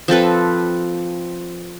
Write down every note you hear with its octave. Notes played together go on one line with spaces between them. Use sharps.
F3 C4 A4 B4